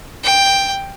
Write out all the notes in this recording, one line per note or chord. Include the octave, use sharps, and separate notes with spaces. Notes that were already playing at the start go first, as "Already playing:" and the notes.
G5